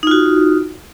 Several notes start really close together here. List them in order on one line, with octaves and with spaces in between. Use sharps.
D#4 F4 F#4